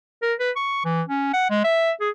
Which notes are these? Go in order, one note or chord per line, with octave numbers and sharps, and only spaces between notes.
A#4
B4
C#6
E3
C#4
F#5
G#3
E5
G#4